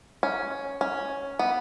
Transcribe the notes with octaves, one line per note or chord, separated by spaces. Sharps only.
C#4
C#4
B3